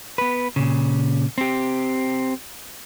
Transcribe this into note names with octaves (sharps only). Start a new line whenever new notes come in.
B3 B4
A#2 C#3
C4 G4